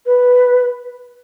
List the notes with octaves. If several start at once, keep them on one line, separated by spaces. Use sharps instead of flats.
B4